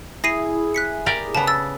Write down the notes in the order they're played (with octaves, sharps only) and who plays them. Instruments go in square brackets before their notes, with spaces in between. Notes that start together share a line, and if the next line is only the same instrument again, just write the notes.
[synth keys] E4 G#4 [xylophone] A#6 C7 D#7
[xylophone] F#6 B6 C#7
[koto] G4 A#4 D5
[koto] C#3 B3 [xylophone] A5
[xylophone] E6 A6